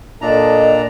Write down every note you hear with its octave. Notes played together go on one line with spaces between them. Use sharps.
A#2 D4 A4 D#5 A#5